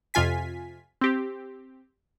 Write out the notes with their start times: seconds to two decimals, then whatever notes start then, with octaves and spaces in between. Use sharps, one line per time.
0.14 F2 C3 F4 G#5 B6
1.01 C4 G4